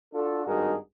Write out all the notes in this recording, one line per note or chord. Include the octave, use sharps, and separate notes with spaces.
D4 F4 F#4 A4
G#1 G2 D#4 F#4 G#4 A#4